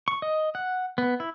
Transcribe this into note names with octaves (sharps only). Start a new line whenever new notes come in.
C#6
D#5
F#5
B3
E4